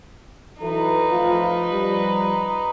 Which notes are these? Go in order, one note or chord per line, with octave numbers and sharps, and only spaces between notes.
E3 F#3 D#4 A4 B4
F3 A3 F4
F3 G3